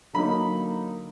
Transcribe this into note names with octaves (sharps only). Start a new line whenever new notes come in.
D3 F#3 A#3 D#4 B5